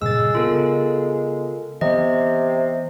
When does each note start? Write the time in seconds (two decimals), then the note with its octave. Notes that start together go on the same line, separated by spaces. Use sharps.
0.02 G2 A#2 C#3 G#3 E6 A6
0.35 C#3 B3 F4 A4 A#4
1.81 C3 E3 B3 D#5